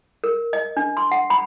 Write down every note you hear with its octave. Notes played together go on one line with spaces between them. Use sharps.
A#4
D#5
D4
C6
F#5
B5